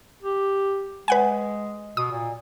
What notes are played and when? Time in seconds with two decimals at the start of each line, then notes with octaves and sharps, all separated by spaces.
0.22 G4
1.08 G#3 B4 F#5 G#5
1.97 B2 D#6
2.11 A#2